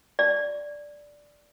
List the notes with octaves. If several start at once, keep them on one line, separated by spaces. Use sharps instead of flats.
D5